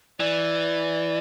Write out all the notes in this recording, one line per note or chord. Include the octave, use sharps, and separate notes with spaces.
E3 D5